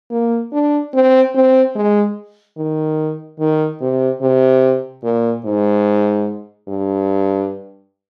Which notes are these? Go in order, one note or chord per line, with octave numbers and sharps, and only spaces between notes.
A#3
D4
C4
C4
G#3
D#3
D#3
C3
C3
A#2
G#2
G2